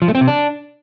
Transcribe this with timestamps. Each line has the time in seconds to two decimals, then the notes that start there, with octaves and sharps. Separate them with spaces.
0.02 F3
0.08 A3
0.15 C4
0.21 C3
0.28 D4